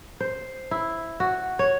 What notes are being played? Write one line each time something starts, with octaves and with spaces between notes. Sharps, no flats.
C5
E4
F#4
C#5